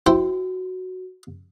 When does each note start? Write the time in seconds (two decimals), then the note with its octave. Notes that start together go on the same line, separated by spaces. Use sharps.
0.07 E4 F#4 C5 G5